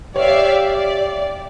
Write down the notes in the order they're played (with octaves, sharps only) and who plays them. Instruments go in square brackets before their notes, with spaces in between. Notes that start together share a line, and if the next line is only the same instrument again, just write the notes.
[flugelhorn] G4 [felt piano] C#5 [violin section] D5 E5 F5
[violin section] D5